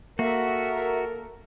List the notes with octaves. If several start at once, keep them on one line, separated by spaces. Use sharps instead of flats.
A#3 F#4 A4 A#4 E5